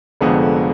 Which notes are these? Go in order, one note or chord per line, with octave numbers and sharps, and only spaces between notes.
F1 F2 D3 G#3 B3